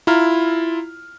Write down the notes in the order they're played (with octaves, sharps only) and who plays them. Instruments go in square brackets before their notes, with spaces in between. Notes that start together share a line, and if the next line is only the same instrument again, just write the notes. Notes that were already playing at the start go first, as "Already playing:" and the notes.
[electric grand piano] E4 F4 A#5 F6